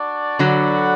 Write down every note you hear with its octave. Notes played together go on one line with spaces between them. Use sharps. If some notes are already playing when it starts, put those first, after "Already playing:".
Already playing: D4 F#4 D5
D3 F#3 F#4 B4 D5 F#5